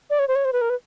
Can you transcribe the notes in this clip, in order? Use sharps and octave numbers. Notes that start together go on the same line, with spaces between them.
D5
C#5
C5
C#5
C5
B4
A#4
B4